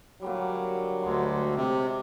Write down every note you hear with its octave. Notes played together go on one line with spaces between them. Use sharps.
A#2 D3 F#3 G3
D2 G#3 C6
C3